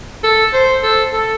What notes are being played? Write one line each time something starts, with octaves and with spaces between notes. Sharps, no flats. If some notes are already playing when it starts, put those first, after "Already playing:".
A4
C5
A4
A4